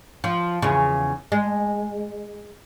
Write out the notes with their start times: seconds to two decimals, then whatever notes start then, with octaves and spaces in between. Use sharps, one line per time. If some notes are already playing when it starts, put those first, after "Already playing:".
0.24 F3
0.62 E2 C#3
1.32 G#3